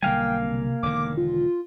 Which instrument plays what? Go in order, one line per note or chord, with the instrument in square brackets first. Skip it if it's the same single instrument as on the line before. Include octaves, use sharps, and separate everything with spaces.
[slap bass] B1 D3 G3 [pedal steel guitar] A#3 F5 G#5 [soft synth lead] G5
[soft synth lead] C3
[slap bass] E1 D3 D#3 [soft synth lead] D6
[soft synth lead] F4